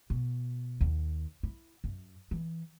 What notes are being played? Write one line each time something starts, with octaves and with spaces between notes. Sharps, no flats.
B2
D#2
E4
F#2
E3